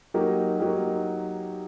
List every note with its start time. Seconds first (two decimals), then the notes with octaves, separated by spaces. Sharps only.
0.14 F#3 A#3 D#4 G4 A#4
0.59 F#3 A#3 D#4 G4 A#4